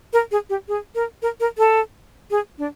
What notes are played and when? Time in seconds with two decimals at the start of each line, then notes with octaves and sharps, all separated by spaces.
0.13 A#4
0.31 G#4
0.50 G4
0.68 G#4
0.95 A#4
1.22 A#4
1.40 A#4
1.58 A4
2.31 G#4
2.58 D4